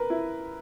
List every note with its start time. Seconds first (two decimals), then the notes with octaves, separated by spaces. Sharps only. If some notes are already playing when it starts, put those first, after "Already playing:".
Already playing: A#4 B4
0.10 E4